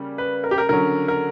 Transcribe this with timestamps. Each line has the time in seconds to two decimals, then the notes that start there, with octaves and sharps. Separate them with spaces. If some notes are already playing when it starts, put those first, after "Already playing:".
Already playing: C#3 G3 A#3
0.18 B4
0.44 A#4
0.51 G4
0.58 A#4
0.69 D3 F#3 C#4 A#4
1.08 A#4